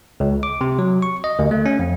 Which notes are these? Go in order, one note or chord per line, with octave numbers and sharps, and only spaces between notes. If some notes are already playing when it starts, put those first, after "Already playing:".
C#2
D6
C3
F#3
C#6
D#5
D2
A3
C#4
F2